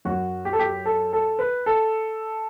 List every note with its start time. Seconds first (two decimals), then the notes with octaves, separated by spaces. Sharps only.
0.05 F#2 F#3 F#4
0.45 G4
0.53 A4
0.59 G4
0.86 A4
1.13 A4
1.39 B4
1.66 A4